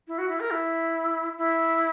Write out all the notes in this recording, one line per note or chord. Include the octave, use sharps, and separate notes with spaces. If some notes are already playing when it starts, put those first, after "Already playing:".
E4
F#4
E4
A#4
E4
E4